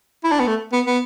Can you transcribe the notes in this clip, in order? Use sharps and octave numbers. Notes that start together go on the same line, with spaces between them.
E4
D4
B3
A3
B3
B3